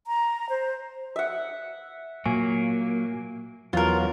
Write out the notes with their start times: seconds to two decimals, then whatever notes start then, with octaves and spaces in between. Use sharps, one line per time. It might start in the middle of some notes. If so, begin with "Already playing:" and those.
0.07 A#5
0.49 C5
1.16 E5 F#5
2.26 A#2 F#3 A#3 G#5
3.73 E2 F#3 F4 A#4